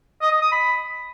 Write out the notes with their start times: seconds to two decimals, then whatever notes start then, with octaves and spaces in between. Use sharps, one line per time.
0.22 D#5
0.32 D#5
0.42 D#6
0.52 B5